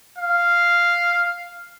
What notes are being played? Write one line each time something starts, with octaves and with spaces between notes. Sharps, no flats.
F5